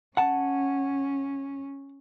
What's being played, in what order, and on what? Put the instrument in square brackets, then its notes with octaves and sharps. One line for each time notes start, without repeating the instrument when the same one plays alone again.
[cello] C#4 [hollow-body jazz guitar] F#5 A5